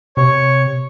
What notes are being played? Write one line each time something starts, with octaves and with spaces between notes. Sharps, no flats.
C3 C#5 C#6